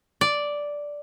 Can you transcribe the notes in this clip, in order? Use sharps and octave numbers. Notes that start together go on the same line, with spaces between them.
D5